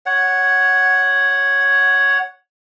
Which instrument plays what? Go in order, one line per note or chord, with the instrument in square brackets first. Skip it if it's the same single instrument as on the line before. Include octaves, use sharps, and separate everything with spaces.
[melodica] C#5 F#5